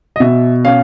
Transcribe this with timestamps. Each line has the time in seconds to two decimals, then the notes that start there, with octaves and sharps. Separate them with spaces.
0.16 D#5
0.20 B2 E5
0.65 C#4 F5